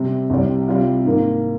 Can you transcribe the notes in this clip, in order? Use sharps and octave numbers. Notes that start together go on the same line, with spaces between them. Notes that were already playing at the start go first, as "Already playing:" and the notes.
Already playing: C3 G3 C4
C2 C3 G3
C3 G3 C4 F4
G#2 D#3 A#3